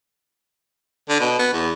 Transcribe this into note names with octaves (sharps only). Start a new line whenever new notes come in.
D3
B2
B3
E2